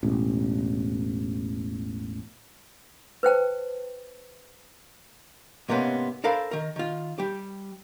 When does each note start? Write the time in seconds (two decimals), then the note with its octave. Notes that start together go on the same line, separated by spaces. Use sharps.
0.03 E1 A1
3.23 B4 C5 G5 A5
5.69 G#2 C3 A#3 B3 C#4
6.24 D4 A4 A#4 C5 F5 B5
6.51 D#3 A#4
6.76 D#3 F4
7.18 G3 G4